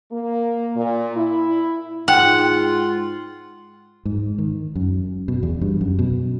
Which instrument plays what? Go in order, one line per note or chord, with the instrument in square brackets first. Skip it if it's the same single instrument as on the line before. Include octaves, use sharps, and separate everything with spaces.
[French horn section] A#3
A#2
E4
[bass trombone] G#2 [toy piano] D#4 G5 [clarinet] F4 [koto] F#5
[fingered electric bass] G#2
D#3
F#2
B2
E2
G2
F#2
B2